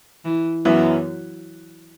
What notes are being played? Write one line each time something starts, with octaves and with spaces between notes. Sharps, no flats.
E3
F#2 E3 F#3 B3 E4